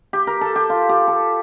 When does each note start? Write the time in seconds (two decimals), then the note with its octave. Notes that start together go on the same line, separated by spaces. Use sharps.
0.13 G4
0.27 A#4
0.41 A4
0.56 G4
0.70 F4
0.89 G4
1.08 A4